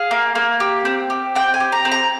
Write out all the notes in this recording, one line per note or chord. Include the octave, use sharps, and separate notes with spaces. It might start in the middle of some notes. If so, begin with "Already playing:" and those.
Already playing: G#4 F5
A#3
A#3
G4
C4
G4
C4 G5
G#5
G4
A#5
C4
A#5